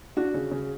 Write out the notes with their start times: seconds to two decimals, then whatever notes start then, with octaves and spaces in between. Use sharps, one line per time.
0.17 D4 F#4
0.34 C#3
0.51 C#3